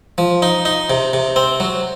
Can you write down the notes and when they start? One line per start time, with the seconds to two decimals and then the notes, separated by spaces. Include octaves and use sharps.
0.18 F3
0.42 D#4
0.65 D#4
0.90 C3
1.13 C3
1.36 C4
1.60 F#3